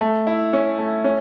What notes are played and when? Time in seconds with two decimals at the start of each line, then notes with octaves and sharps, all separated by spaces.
0.01 A3
0.27 E4
0.53 C#4
0.78 A3
1.04 C#4